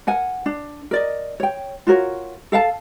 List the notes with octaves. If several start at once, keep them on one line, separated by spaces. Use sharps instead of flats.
A#4 F#5 G#5
D4
A#4 D5 D#5
C#5 G5
F4 F#4 A#4 C#5
A4 F5 F#5 A5